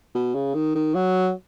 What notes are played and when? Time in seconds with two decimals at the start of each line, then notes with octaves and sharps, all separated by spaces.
0.15 B2
0.34 C#3
0.54 D#3
0.75 D#3
0.95 F#3